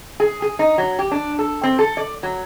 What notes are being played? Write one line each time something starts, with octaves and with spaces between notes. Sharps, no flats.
G#4
G#4
D#4
F#3
G4
D4
A4
C4
A4
D5
F#3